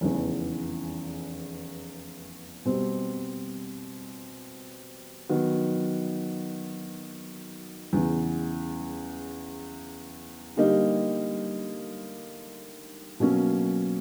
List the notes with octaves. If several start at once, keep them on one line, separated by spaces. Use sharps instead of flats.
F1 E2 C#3 E3
B2 G3 C4
D#3 F#3 B3
E2 C#3 E3
D3 G3 A#3 D#4 G4
B2 F#3 A#3 C#4